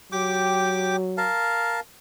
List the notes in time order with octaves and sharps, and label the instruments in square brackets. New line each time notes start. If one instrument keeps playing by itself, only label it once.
[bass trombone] F#3 [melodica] G4 G5 D6
[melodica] A#4 F5 A5